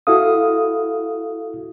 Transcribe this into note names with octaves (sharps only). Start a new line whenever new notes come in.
E4 F#4 A4 F5 D#6